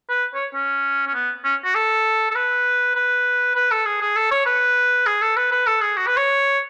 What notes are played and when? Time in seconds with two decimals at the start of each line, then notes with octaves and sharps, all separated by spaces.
0.09 B4
0.35 C#5
0.54 C#4
1.07 C#4
1.14 B3
1.45 C#4
1.65 F#4
1.75 A4
2.31 A4
2.35 B4
2.95 B4
3.56 B4
3.71 A4
3.86 G#4
4.01 G#4
4.16 A4
4.31 C#5
4.46 B4
5.06 G#4
5.22 A4
5.36 B4
5.52 B4
5.67 A4
5.82 G#4
5.97 F#4
6.07 B4
6.17 C#5